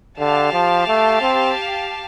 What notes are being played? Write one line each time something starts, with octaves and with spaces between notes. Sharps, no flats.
D3 G4 F5 A5
F3
A3
C4